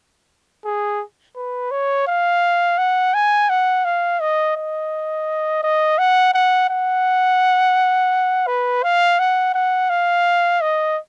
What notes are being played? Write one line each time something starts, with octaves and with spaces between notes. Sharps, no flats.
G#4
B4
C#5
F5
F#5
G#5
F#5
F5
D#5
D#5
D#5
F#5
F#5
F#5
B4
F5
F#5
F#5
F5
D#5